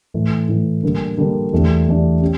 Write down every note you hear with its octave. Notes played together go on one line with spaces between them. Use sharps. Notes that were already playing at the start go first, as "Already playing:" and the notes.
A2 E3 A3
A2 E3 A3
D3 G3 A#3 D4
D3 G3 A#3 D4
E2 E3 A3 D4 G4
E2 E3 A3 D4 G4
C#4 G4